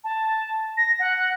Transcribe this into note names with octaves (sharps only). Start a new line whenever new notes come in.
A5
A#6
F#5